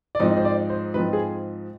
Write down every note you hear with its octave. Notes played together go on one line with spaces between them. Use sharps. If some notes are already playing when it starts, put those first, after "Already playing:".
D5
G#2 F3 C4 D#4 D#5
C5
D5
C5
G#2 F3 C4 D#4 B4
G#4